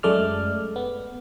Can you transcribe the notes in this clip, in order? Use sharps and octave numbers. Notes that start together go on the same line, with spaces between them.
F#2 G#3 A3 D5 F6
B3